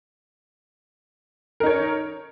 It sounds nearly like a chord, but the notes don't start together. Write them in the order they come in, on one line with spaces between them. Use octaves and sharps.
A#4 D#4 C#5